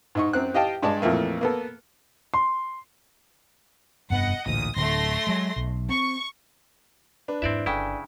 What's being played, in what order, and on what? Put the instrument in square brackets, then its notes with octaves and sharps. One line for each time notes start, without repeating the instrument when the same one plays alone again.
[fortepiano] G#2 D#4 C#6
F#2 C4 F#6
G4 D#5 F5 G5 A5
G2 G#3 D5 A5
F2 A#2 E3 A3 A#3
A#3 B3 A4
[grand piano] C6
[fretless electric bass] F1 G2 B3 [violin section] D#5 F#5
[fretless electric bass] A1 D2 A#2 [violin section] D#6
[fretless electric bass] D1 D3 [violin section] A3 C6 A#6
[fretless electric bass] F#3 G#3
B1
[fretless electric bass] C4 [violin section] C#6
[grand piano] D4 B4
[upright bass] E2 G#2 [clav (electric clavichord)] C4 D5 E5 [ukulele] E4
[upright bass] G1 [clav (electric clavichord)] C#3 E4 [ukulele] A4 G5 G#5